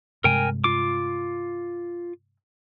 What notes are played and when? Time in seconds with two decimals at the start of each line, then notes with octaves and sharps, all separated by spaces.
0.24 G2 C3 G#3 A#4 G5 G#5
0.64 F4 D6